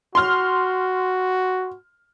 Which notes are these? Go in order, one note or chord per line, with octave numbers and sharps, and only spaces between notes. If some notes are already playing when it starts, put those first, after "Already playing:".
F#4 C6 F6